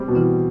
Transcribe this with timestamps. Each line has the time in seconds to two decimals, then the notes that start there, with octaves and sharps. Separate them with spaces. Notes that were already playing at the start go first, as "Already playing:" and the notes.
Already playing: G3 C4
0.08 B2
0.15 E3 E4